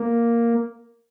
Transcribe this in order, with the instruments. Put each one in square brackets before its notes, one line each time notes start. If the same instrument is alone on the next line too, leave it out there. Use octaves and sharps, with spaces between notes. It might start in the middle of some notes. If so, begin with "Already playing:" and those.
Already playing: [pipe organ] A#3